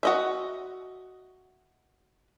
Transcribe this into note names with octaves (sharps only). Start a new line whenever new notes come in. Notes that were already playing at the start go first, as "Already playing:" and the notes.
F#4 D#5 E5